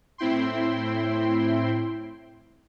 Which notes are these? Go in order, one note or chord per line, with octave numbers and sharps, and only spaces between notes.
A2 C4 E4 G5 C6